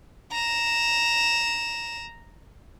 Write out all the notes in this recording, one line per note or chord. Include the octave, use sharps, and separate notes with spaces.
A#5 E7